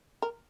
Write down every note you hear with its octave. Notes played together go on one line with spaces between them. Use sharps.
A#4